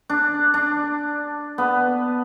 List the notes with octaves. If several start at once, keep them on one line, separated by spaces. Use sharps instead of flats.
D4
D4
B3